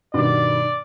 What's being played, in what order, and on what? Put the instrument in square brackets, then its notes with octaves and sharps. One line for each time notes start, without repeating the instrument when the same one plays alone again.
[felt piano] G2 B2 D#3 [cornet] D5